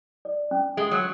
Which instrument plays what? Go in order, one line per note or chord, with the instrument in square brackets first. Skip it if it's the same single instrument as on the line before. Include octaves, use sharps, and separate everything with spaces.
[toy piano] D5
C#4
[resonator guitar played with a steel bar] G#3 [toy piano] A4
[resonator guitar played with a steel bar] F#3